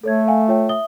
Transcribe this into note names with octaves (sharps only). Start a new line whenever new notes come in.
A3 A4 C#5 G#6
F5 F#5 G#5
F4 C#5 G5
E5 D#6 G7